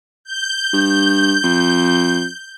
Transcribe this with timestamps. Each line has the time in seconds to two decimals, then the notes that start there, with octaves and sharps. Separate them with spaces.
0.24 G6
0.73 G2
1.43 F2